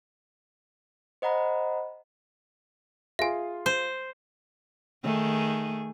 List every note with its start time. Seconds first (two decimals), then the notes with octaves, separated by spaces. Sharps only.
1.22 C5 D#5 F#5 A#5 B5
3.19 F4 G#4 E5 G#5 C6
3.66 C5
5.03 D#3 A3 G#4